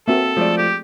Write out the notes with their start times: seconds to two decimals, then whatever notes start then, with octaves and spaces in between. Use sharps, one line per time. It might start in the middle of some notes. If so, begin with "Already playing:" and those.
0.08 A#3 C4 F#4 A4 E5
0.37 F3 G#3 A3 D5
0.58 G4